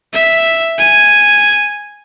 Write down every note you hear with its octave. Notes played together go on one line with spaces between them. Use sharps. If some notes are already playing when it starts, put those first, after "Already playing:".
E5
G#5